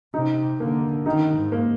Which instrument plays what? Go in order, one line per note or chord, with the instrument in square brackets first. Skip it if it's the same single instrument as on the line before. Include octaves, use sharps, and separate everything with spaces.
[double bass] C3 [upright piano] D#4
[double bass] D3 [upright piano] A#3
[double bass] D#3 [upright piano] D#4
[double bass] G#2
[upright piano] A#3